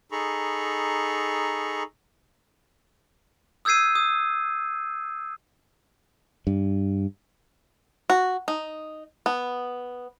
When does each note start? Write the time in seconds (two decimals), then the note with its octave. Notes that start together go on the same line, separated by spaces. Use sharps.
0.12 D#4 G#4 A4 A#5 B5 C#6
3.65 D#6 E6 G6 G#6 C7 D#7
3.95 D#6
6.47 G2
8.10 F#4
8.48 D#4
9.26 B3